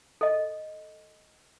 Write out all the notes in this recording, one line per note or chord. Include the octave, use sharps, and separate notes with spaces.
A4 D#5